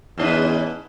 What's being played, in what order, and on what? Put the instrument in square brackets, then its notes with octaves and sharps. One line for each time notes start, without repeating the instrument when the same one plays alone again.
[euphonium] E2 [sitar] G#2 C#4 B4